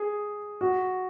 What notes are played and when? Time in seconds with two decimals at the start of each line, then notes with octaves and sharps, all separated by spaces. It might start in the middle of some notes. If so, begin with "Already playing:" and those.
Already playing: G#4
0.61 F#4